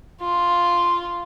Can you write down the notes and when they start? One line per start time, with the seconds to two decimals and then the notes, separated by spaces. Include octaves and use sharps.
0.22 F4